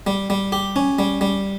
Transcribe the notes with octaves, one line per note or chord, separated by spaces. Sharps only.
G3
G3
G4
C#4
G3
G3